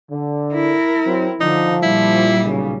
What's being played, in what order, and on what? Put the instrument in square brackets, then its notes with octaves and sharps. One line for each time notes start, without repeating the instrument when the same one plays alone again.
[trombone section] D3
[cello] E4 A#4
[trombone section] F#3 C4
[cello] D3 [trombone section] F3 [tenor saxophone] D#4
[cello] A#2 G3 [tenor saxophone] E4
[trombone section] B1 C#3